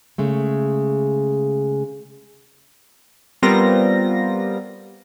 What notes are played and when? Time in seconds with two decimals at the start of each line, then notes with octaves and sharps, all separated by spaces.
0.18 C#3 G#3 A3
3.43 G3 B3 C4 F4 A#4 A#6